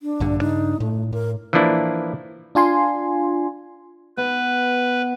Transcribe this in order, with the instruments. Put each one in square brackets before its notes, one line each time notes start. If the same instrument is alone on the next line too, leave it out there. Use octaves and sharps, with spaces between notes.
[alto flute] D4
[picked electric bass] A#1 G2 D3
[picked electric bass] G2 C#3 D4 [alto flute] D#4
[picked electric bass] A2 [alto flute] A3
[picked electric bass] A2 [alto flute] A#4
[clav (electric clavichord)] E3 F3 A#3 D4 E4
[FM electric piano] D4 F4 G#5 C6
[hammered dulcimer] B3 [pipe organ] B4